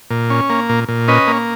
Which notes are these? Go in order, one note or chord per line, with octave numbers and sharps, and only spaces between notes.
A#2
C#4
A#3
A#2
A#2
C#4 B4 D#5
A#3